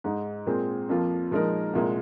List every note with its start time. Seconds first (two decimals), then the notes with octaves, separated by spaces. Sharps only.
0.04 G#2 G#3 D#4
0.46 A#2 G#3 C4 G#4
0.89 F2 F3 A#3 F4
1.31 A#2 F3 G#3 D#4 A#4
1.73 C2 A#2 G#3